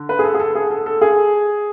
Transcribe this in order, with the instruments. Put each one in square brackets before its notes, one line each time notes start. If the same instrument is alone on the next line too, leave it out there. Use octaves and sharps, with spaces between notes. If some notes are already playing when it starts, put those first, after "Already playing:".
Already playing: [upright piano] D3
B4
G#4
A4
G#4
A4
G#4
A4
A4
G#4